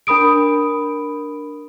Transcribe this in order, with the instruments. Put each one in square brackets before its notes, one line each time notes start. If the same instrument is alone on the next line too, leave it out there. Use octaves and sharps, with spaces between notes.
[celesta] D4 A#4 B5 D#6 D7